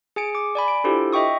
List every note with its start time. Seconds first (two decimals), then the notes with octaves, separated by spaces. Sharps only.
0.16 G#4 G#5 C#7 D7
0.35 D6
0.55 D5 G#5 B5
0.68 D7
0.84 D4 E4 F4 G4 A4 C5
1.13 D#5 E5 G5 C#6 D#6